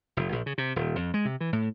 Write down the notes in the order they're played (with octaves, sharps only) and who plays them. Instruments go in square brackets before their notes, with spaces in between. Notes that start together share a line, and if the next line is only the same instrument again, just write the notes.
[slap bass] F1
A#1
C#3
C3
D#1
F2
G#3
C3
E3
A2